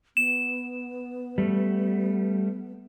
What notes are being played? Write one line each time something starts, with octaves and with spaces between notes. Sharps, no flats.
B3 E7
G3 A3